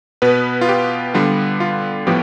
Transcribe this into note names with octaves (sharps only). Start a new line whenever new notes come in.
B2 B3 B4
F4
G4
D3 G3 B3 F4
F4
A2 F3 B3 G4